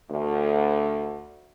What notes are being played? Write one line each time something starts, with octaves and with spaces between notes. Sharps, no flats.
D2